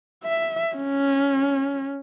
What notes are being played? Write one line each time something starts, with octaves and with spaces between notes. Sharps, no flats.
E5
C#4